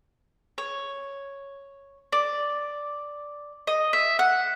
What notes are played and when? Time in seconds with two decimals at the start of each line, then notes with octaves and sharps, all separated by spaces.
0.58 C#5
2.12 D5
3.67 D#5
3.93 E5
4.19 F#5